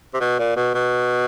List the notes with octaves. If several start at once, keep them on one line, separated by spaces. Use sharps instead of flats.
C3
B2
A#2
B2
B2